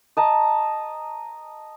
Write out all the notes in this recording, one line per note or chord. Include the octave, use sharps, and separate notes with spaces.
D#5 A5 A#5